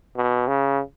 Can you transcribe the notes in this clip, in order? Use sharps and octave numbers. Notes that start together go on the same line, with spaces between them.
B2
C#3